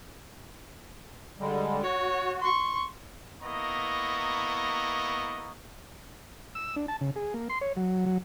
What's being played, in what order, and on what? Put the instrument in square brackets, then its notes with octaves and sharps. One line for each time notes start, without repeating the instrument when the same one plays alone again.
[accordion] D3 G3 G#3
[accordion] F#4 [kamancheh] C#5
[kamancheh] C6 C#6
[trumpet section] A#3 B3 E4 D#5 A#5 C#6
[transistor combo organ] E6
D4
A5
C#3
G#4
A#3
C6
C#5
F#3
F#3